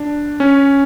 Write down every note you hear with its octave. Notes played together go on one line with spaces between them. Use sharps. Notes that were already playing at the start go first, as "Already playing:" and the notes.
Already playing: D4
C#4